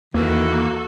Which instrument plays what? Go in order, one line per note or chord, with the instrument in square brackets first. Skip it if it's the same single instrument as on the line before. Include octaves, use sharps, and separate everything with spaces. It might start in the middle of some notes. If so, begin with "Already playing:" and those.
[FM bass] E2 [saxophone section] D#3 E3 [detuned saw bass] A#3 [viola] F#4 A4